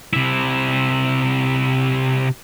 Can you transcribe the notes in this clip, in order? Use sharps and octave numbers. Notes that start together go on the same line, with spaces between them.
C3 E4